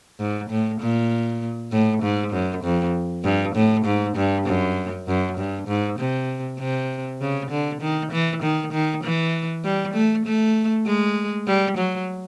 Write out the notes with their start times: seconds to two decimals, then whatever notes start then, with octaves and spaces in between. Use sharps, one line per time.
0.20 G#2
0.50 A2
0.81 A#2
1.72 A2
2.02 G#2
2.32 F#2
2.64 F2
3.24 G2
3.55 A2
3.85 G#2
4.16 G2
4.46 F#2
5.08 F#2
5.37 G2
5.68 G#2
5.99 C3
6.59 C3
7.21 C#3
7.51 D3
7.81 D#3
8.12 E3
8.43 D#3
8.72 D#3
9.03 E3
9.64 G3
9.94 A3
10.26 A3
10.86 G#3
11.47 G3
11.77 F#3